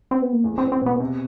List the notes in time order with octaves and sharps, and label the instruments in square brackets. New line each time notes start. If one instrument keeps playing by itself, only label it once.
[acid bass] C4
B3
A#3
[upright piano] E2 [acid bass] A3
[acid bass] C4
[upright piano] E2
[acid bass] C4
[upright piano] B2 [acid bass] B3
[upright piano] C3